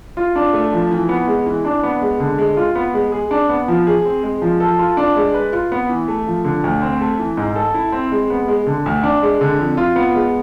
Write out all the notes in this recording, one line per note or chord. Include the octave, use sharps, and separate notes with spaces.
F4
D4
A3
F3
E3
B3
G#3
E3
D4
B3
G#3
D3
G#3
F4
B3
G#3
G#4
D4
B3
F3
G#4
C4
G#3
F3
A4
F4
D4
G#3
B4
F4
B3
E3
A3
F3
D3
D2
C4
A3
E3
G#2
A4
E4
C4
G#3
B3
G#3
D3
D2
D4
G#3
D3
F2
F4
B3
G#3